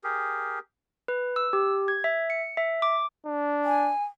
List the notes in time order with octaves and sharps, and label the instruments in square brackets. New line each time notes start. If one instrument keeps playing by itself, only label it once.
[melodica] G4 G#4 A#4
[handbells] B4
E6
G4
G#6
E5
C#7
E5
D6
[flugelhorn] D4
[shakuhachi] G#5